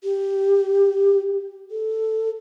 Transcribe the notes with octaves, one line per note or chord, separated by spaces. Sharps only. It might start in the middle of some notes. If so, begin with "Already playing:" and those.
G4
A4